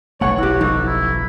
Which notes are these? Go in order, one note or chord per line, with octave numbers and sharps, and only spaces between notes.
F#1 B1 A3 C#5 F#5
E4 F#4 G4
F3 D#4 A4
E4